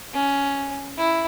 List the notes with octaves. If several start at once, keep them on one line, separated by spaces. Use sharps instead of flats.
C#4
E4